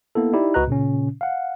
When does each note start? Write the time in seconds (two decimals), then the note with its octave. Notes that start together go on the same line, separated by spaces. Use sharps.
0.15 A#3 B3 E4 A4
0.33 D#4 E4 G4 D5
0.54 C#2 F#4 B4 D#5 A#5 F#6
0.67 A#2 C#3 C#4
1.21 F5 F#5